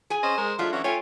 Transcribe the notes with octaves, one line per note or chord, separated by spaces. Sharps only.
G#4 G#5
C#4 C5 D#5
G#3 A#4
F#3 G#3 A3 D4 F4 E5
E3 C#4 F#4
A3 F4 C#5 G5 G#5